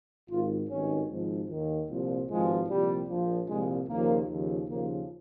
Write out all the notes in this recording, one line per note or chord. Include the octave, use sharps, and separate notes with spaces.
G#1 G#2 D#3 F4
G#1 G2 D#3 C#4
G#1 G#2 F3
D#2 D#3
C2 A#2 F3
G#1 G2 F3 G#3
C2 A#2 F3 G3
A#1 A#2 F3
C2 A#2 F3 G#3
D#2 C#3 F3 A#3
D#2 C#3 F3
D#2 C#3 F3 A#3